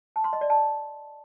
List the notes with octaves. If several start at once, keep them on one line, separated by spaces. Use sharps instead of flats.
A5
C6
D#5
D5
A5